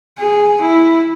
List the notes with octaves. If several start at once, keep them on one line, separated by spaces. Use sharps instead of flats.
G#4
E4